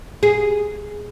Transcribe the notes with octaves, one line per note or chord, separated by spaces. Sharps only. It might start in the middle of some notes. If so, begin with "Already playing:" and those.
G#4